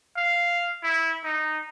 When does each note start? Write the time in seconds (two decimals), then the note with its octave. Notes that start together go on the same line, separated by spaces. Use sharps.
0.16 F5
0.83 E4
1.24 D#4